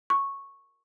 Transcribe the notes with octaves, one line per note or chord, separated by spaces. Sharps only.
C#6